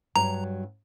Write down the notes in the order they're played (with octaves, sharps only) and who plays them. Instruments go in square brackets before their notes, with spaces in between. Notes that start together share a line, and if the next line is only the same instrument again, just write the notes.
[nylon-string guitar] G2 F#3 [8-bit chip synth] A#5